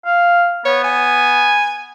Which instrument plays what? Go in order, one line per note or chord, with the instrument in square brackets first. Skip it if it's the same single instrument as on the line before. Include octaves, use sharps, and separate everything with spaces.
[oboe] F5
[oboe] B3 [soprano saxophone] C#5
[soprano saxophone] G#5